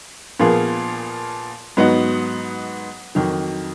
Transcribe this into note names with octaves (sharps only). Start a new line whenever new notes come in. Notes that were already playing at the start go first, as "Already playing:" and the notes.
A#2 F3 B3 F4 G#4
G#2 F#3 B3 D#4 F#4
F2 D#3 F#3